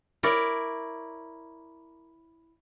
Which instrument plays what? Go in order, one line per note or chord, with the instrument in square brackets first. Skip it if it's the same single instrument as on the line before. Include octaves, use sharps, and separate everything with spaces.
[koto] E4 A#4 C#5 D5